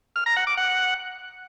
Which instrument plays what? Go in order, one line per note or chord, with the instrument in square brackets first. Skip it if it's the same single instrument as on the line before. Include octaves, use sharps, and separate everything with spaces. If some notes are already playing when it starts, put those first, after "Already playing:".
[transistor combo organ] F6
A#5
F#5
D6
F#5